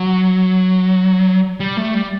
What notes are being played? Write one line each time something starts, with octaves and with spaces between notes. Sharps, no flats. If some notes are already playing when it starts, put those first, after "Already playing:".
Already playing: F#3
G3
A3
G3